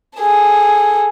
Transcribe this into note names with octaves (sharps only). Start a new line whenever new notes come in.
G#4 A4